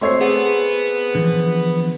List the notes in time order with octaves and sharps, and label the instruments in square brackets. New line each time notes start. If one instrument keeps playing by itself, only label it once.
[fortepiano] A3 C4 C#5 [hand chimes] C6 E6 C7
[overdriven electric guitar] B3 [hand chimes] G#4 F#5
[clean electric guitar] D3 E3 F3